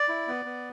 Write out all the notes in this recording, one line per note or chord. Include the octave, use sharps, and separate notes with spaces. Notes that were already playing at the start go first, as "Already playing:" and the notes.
Already playing: D5
E4
B3
B3